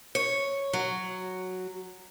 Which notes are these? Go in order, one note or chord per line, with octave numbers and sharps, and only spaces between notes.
C#5
F#3